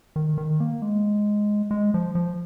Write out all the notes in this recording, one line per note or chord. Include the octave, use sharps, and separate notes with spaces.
D#3
D#3
A#3
G#3
G#3
F3
F3